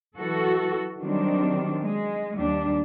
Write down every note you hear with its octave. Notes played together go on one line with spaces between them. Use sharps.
E3 F#3 F#4 A4
D#3 F#3 G3 C4 D4
G#3
D#2 G3 D4